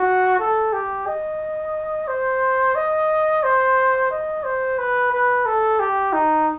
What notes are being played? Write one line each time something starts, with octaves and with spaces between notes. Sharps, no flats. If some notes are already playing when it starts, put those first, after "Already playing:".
Already playing: F#4
A4
G4
D#5
C5
D#5
C5
D#5
C5
B4
B4
A4
G4
D#4